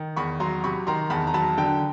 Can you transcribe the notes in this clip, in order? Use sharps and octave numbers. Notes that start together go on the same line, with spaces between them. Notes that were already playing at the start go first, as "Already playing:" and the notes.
Already playing: D#3
E2 B5 C#6
F#3 A#5 C6
C3 B5 C#6
D#3 A#5 C6
E2 A5 B5
A#5
F#3 A5 B5
D3 G5 A5